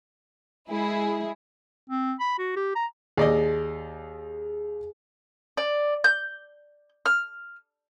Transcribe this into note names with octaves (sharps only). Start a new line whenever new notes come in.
G#3 E4 G#4
C4
B5
F#4
G4
A#5
D#2 G#4 D5 D#5
D5
G6
F6